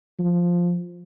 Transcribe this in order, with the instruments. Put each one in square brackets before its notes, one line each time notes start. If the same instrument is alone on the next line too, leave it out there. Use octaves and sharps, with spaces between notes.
[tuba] F3